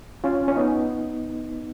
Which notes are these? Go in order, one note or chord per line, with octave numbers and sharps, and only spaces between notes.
C#4 F4
C#4
B3 D#4